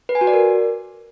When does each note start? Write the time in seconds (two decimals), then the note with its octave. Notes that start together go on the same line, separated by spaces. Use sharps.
0.09 B4
0.15 G#5
0.21 F#4
0.27 D5
0.33 A#4